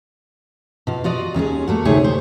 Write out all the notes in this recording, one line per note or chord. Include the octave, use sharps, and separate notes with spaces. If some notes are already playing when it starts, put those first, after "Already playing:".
B2 F4
F4 F#4 D5 D#5
D#2 C#4 F4 G#4
A3 A#3 F#4
D2 C3 D#4 G#4 C#5
C5